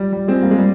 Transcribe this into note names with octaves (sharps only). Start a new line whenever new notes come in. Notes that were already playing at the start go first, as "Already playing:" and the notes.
Already playing: G3
G3
G#3 C4
G3 A#3
G#3
G3